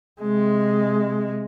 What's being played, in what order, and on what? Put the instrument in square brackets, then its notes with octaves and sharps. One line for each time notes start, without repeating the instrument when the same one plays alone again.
[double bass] C3 G#3